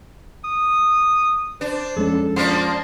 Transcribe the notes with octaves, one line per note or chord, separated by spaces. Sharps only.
D#6
D4 C5
F2 G#3 C#4 A4
F3 A#3 D4 C6